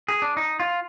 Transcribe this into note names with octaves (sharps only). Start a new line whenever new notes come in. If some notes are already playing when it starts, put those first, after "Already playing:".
G#4
D4
D#4
F4